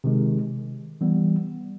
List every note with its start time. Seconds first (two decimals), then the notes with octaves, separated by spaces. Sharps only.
0.04 C3 D#3 G#3
1.01 E3 G3 B3